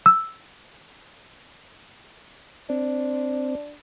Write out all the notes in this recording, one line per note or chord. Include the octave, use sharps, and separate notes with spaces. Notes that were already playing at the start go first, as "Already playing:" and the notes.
E6
C4 D4